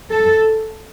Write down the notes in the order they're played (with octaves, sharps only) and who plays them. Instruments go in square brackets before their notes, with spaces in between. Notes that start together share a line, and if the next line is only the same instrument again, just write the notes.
[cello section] A4